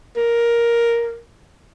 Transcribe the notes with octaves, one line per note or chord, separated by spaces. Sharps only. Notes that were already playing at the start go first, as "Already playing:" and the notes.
A#4